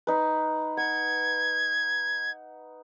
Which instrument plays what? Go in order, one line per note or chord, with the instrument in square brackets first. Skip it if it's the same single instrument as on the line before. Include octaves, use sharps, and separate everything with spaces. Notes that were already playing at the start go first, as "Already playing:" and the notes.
[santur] D#4 B4
[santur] F#5 [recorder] G#6